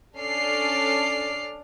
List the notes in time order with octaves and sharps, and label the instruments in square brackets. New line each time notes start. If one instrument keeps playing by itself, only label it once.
[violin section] C#4 D4 A4 D6 F6 C7